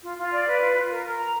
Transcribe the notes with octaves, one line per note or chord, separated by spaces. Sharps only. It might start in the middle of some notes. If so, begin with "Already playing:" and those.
F4
F4
D5
B4
F4
F4
A#4
A#4
A#5